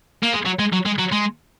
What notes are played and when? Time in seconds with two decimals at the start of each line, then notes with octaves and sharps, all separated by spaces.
0.23 A#3
0.33 G#3
0.46 F#3
0.59 G#3
0.73 F#3
0.86 G#3
0.98 F#3
1.12 G#3